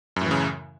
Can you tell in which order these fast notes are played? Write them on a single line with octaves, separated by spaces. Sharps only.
F#2 A2 E3 C#3